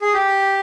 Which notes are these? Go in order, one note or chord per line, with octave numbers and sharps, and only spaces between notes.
G#4
G4